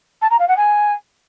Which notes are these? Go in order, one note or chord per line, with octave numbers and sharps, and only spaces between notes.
A5
A#5
F5
F#5
G#5